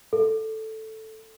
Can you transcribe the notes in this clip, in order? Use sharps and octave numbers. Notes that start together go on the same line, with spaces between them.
A4